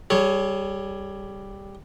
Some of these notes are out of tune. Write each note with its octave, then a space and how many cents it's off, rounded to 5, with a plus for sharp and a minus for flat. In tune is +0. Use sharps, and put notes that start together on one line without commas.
G3 +0 G#4 +40 C#5 +0